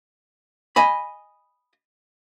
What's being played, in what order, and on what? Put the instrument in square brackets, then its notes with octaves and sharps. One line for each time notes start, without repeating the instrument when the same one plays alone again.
[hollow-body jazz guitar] D#5 G#5 B5